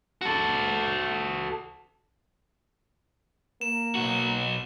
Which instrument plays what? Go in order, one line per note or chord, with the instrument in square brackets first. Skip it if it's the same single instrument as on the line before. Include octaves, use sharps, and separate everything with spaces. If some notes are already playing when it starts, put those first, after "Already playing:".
[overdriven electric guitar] F#4 A4
[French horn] A#3 [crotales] E7
[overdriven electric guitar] B1 F#4